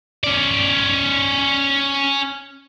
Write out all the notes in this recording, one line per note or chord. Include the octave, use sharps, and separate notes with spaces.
C#4 D5